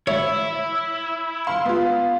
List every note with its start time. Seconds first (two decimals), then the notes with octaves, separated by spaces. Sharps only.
0.07 E4 C#5 E5
1.47 F5 C6
1.65 B3 F4